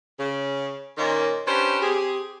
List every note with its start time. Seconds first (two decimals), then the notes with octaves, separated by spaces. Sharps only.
0.20 C#3
0.97 A#2 D#3 A#3 C#4 D#4
1.47 C#4 D4 G4 B4 C5
1.82 C4 G4 G#4